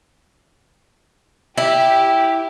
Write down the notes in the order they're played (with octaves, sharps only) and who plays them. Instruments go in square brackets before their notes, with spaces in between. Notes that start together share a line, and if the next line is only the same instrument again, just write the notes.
[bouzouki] E4 [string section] G4